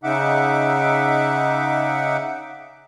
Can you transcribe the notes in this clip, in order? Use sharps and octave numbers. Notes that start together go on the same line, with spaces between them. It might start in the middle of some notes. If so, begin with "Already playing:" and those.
C#3 D#4 E5 F#5 D6